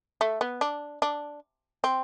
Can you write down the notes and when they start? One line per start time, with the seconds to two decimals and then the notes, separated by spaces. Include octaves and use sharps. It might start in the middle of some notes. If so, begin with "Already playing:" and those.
0.21 A3
0.41 B3
0.61 D4
1.02 D4
1.84 C4